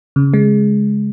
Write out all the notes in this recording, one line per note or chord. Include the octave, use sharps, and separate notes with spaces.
C#3
G#3